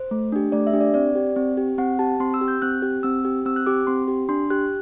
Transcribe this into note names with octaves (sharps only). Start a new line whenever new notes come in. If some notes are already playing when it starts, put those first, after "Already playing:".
Already playing: C5
A3
D4 G4
A3 D5
E5
D4 G4
D5
C4 D5
G4
C4
G4
C4 F#5
G4 A5
C4 C6
E6
G4
G6
C4 F#6
G4
C4 E6
G4
C4 E6
F#6
G4 D6
C4 C6
G4
D4 C6
G4 F#6